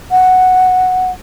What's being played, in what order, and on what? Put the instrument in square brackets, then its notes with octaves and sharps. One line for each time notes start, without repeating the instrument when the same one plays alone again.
[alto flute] F#5